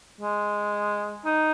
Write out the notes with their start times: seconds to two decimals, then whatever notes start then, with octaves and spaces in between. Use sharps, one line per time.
0.21 G#3
1.25 D#4